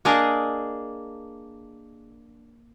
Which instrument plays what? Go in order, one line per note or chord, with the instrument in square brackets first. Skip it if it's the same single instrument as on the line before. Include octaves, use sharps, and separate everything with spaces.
[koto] A#3 D4 G#4 A#4 D5 D#5